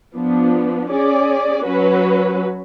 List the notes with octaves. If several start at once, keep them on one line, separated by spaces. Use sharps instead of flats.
F3 B3 D4
C#4 G#4 D5
F#3 C#4 F#4 B4